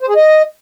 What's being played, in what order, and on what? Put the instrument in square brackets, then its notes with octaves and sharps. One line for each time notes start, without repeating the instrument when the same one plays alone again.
[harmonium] C5
G#4
D#5